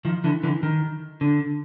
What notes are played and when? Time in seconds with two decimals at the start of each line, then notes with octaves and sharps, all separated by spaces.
0.05 D#3 F3
0.24 D3 E3
0.43 D3 E3
0.63 D#3
1.21 D3